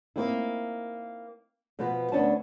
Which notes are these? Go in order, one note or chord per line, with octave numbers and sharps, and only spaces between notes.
A#3 C4 D#4 E4
B2 F3 B3 B4
D2 B3 C#4 D4 A5